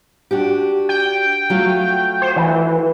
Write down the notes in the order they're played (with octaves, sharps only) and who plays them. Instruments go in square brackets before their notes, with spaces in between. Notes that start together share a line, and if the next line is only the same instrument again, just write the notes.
[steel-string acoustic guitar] D4 F#4 G4
[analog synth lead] G5
[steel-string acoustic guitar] F#3 A3 F4
[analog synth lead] C5
E3